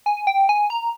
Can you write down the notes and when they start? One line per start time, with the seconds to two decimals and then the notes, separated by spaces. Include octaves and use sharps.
0.06 G#5
0.27 G5
0.49 G#5
0.70 A#5